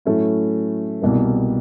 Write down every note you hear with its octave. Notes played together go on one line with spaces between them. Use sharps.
A2 F#3 A3 C#4 E4
C2 B2 G3 A#3